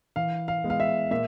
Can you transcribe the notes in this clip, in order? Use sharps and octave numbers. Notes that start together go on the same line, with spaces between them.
E3 F5
F5
G#3 B3
F5
E5
A#2 E5